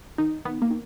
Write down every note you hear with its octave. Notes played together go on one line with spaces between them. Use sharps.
D#3 D#4
D#3 B3
A#3
D#3